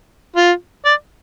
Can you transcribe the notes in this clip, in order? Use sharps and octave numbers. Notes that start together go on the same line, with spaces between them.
F4
D5